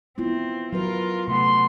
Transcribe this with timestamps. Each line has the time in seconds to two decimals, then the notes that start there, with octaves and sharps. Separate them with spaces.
0.18 B3 C4 E4 F4
0.73 F#3 F4 F#4 A#4 B4
1.28 C3 A3 B3 C6